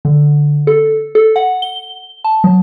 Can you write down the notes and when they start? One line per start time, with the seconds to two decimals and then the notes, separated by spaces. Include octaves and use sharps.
0.05 D3
0.67 A4
1.15 A4
1.36 F#5
1.62 G7
2.24 A5
2.44 F#3